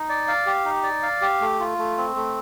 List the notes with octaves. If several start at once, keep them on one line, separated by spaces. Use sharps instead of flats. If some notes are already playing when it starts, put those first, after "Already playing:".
Already playing: D#4
D5
F5
G4
D#4
D5
F5
G4
A3
F4
A3
C4
A3